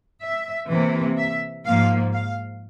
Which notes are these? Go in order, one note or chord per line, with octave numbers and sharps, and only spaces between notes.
E5
C3 E3 A#3
E5
G#2 F3 A#3 F5
F5